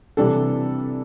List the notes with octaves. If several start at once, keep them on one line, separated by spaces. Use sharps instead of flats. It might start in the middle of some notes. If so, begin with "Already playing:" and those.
C3 E3 G3 D4 A4